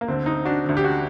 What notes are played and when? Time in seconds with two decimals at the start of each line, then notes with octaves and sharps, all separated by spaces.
0.01 A#3
0.08 D2 D3 C4
0.26 C4 D#4
0.45 D4 F#4
0.65 D2 D3
0.77 G4
0.84 D4 F#4